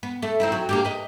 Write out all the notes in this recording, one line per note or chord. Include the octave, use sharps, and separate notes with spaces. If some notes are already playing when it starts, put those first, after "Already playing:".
B3
A3
C4 D#4 E4
F#3
A#3 D4 G4
B4 D#5